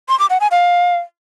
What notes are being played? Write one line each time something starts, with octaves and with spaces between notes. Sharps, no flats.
C6
D6
F#5
G#5
F5